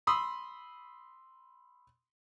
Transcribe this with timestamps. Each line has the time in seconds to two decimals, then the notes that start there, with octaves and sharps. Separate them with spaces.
0.07 B5 C6 D#6 E6